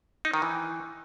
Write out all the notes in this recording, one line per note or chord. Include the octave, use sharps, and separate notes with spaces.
D#4
D#3
E3